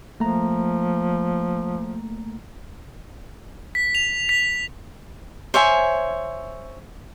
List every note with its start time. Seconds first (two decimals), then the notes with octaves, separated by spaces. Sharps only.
0.20 F3 A3 A#3 A#5
3.75 B6
3.95 F7
4.29 B6
5.54 C5 C#5 E5 G#5